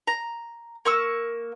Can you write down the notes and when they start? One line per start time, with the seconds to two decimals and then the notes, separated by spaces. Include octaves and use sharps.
0.07 A#5
0.85 A#3 C#6 E6